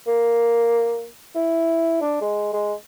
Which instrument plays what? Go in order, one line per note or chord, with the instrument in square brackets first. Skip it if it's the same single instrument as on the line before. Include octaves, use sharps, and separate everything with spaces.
[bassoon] A#3
E4
D4
G#3
G#3